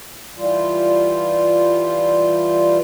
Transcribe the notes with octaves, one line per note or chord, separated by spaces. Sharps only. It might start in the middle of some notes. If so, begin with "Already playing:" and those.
E3 G3 F4